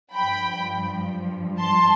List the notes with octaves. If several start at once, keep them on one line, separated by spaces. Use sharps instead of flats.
G2 F3 G5 B5
A5 C6